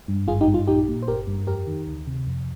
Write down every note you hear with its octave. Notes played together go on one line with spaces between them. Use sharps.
G2
G#1 F4 G#4
D#4 G4
G2
F4
A#1 D#4 G4
A#2
C5
G1 G4 A#4
G2
F2 G4 A#4
D#3
D2
C3
F2